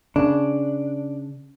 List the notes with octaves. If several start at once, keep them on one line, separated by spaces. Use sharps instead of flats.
C#3 D4